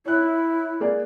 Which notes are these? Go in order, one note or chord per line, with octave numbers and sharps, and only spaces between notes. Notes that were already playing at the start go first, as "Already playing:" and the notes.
E4 C#5 F#6
A#3 G#4 D5